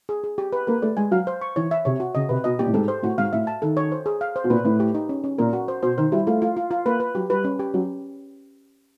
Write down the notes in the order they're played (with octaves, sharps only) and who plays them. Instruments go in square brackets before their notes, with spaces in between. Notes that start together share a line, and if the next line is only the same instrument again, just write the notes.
[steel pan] G#4
G#4
G4
B4
[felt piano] A#3 [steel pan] B4
[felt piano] A3 [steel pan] D5
[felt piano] G#3 [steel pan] G#5
[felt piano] F#3 [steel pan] F5
[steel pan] C5
C#6
[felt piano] E3 [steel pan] C#5
[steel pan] E5
[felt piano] C3 [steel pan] C#5
[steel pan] F#4
[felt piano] C#3 [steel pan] D#5
[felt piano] C3 [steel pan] B4
[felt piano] B2 [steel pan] D#5
[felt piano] A#2 [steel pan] G4
[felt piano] A2
[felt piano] G#2 [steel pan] A4
[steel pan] C5
[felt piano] A2 [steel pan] F#4
[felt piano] G#2 [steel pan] F5
[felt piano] A2 [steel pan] E5
[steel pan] A5
[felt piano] D#3 [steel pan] A4
[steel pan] C#5
C5
G#4
F5
C5
[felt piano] B2
[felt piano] A#2 [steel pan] B4
[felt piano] A2 [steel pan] B4
[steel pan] G4
D#4
C#4
C#4
[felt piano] A#2 [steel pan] A#4
[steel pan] F#4
C5
[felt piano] B2 [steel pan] C5
[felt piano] D#3 [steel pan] C5
[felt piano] G3 [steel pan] E4
[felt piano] A3 [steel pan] F4
[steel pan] F4
F4
F4
[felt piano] A#3 [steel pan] B4
[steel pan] B4
[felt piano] F#3 [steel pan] G4
[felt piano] G3 [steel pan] B4
[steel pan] C#4
G4
[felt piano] F#3 [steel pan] C#4